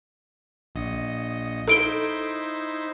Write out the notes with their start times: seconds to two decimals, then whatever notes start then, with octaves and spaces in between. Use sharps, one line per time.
0.75 A#1 D#5 C#7
1.68 D#4 E4 A4 C5 D7 G7